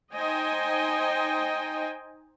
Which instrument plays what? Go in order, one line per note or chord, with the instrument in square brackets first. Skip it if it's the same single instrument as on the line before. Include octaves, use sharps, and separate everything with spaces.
[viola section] D#4 C5 D#5 G5 G#5